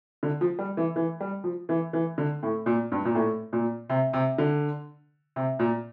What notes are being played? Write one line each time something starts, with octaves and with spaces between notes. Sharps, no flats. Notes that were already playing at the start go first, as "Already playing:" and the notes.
D3
F3
G3
E3
E3
G3
F3
E3
E3
D3
A2
A#2
G2
A#2
A2
A#2
C3
C3
D3
C3
A#2